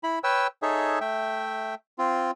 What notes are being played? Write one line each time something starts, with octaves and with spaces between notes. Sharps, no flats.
E4 B5
B4 C#5 G5 E6
D#4 G#4 A4 C#5 E5
A3 E5 G5
C4 F4